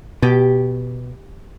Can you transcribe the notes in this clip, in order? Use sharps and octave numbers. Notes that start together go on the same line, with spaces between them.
B2 G4